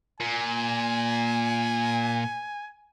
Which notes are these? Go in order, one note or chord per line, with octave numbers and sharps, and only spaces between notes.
A#2 G#5